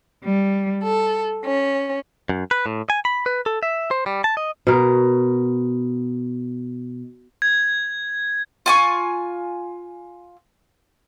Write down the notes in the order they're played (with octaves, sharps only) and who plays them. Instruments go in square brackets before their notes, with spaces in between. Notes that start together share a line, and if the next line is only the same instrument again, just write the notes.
[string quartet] G3
A4
C#4
[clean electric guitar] F#2
B4
A2
G#5
B5
B4
A4
E5
C5
G3
A5
D#5
[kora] B2 A#4
[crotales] G#6
[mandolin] F4 G#5 C#6